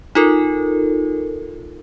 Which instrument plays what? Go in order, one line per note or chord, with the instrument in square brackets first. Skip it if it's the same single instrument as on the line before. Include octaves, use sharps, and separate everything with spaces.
[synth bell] D#4 F4 A4 A#4